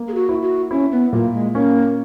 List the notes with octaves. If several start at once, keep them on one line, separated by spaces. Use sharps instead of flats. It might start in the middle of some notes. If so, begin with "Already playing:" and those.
Already playing: A#3
G#4
F#4
E4
F#4
C#4 E4
B3
A#2 A#3
G#3
A#3 C#4